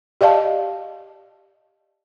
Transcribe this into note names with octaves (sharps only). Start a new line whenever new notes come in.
G4 D5 D#5 F5 A5